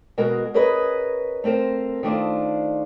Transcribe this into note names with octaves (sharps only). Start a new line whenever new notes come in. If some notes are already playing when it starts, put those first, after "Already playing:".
B2 G#3 F#4 A#4
C#4 G#4 A#4 B4 D#5
A3 C4 A#4 C5
D#3 A3 D4 F4 C5